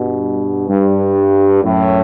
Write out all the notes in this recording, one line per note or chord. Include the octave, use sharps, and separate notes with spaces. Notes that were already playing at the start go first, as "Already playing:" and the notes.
Already playing: G2 B2
G2
F#2 A2